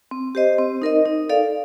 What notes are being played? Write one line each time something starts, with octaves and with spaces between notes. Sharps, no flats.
C4
G4 C5 D#5
C4
D#4 A#4 D#5
D#4
A4 D5 F5